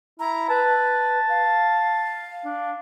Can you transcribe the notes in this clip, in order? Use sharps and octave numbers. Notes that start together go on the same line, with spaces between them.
E4 A#5
B4 A5
F5
D4